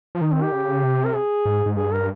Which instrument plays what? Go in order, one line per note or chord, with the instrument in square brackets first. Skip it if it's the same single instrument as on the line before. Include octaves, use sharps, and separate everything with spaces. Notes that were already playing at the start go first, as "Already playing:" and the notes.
[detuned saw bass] F3
[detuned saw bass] D#3 [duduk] D#4
[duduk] C4
G4
[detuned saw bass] C#3
C3
[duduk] A#4
G#4
[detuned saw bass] G#2
G#2
[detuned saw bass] G2 [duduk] G#4
[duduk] A#4